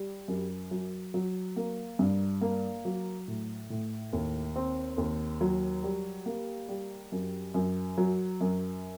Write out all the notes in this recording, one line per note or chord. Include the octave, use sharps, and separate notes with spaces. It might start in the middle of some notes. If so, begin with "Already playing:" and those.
Already playing: G3
F#2
F#3
F#3
A#3
G2
A#3
F#3
A2
A2
D#2
C4
D#2
F#3
G3
A#3
G3
F#2
F#2
F#3
F#2